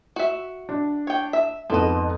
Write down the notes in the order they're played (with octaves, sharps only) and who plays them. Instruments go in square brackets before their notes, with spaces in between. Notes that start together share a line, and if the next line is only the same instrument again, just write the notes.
[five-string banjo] F#4 E5
[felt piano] D4
[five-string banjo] C#5 G5
E5
[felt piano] F2 G#2 B3 [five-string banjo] F3 D#5